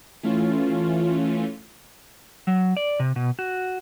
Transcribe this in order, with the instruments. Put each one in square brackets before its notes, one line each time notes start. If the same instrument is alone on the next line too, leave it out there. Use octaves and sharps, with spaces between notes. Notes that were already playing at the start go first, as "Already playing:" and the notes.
[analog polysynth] E3 A3 C#4 F4
[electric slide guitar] F#3
D5
C3
B2
F#4